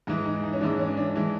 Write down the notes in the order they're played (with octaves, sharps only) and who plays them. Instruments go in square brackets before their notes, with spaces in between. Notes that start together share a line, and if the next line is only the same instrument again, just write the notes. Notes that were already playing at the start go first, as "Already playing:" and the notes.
[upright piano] G#2 E3 G#3 D#4
D#4
D#4
C#4
G#2 E3 G#3 D4
C#4
D4
E3 G#3